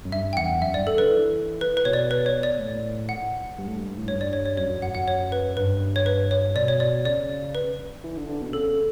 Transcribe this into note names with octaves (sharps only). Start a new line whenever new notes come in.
F#2
G2 E5
G5
E2 F#5
F#2 E5
G2 D5
A4
D3 B4
E3
B4
B4
B2 C#5
D5
B4
C#5
D5
A2
F#5
G2
A2
G2
A2
G2 C#5
D5
C#5
C#5
F#2 C#5
F#2
F#2 F#5
F#2 F#5
C#5
B4
G2 B4
C#5
B4
C#5
B2 D5
C#5
D5
C#3 D5
B4
E3
D3
D3
B2
C#3 A4